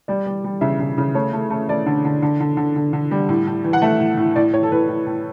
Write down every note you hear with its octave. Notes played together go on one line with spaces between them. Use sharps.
G3 D5
G3
G3
C#3 E5
C#3
C#3
A3 C#5
A3
A3
A3 D5
D3
D3
D3
D3
D3
D3
D3
G3
A2
A2
E3
F#5
A3 E5
A2
A2
A2 D5
A2 C#5
A4
A2 B4
A2
A2